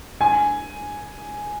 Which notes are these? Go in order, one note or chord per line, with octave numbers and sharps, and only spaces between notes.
G#5